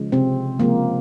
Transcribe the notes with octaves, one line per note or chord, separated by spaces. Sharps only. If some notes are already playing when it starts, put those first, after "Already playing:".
Already playing: C#3 F3 G#3
C3 C4
C#3 F3 G#3 A#3